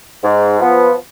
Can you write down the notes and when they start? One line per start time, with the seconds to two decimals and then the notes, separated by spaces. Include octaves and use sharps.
0.24 G#2
0.59 F3 B3